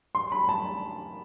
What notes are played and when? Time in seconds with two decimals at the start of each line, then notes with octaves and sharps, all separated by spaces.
0.15 C6
0.32 B5
0.49 A5